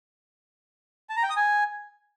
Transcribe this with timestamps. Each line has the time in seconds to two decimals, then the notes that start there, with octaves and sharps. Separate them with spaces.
1.10 A5
1.16 A#5
1.23 G5
1.30 D#6
1.37 G#5